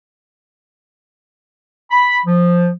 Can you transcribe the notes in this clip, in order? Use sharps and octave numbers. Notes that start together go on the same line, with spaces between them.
B5
F3